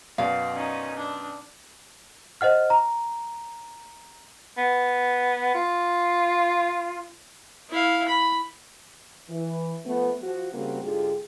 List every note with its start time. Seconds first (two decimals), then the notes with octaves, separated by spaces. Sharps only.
0.18 F#2 B2 D5 F5
0.54 C#4 D#4
0.97 D4
2.41 C5 D#5 F#5 F6
2.70 A#5
4.57 B3
5.54 F4
7.70 E4 F5
8.08 B5
9.29 E3
9.86 F3 A3 B3
10.23 F3 F#4
10.52 C#3 G3 A#3 C4 F#4
10.83 G#2 D3 F4 G4 G#4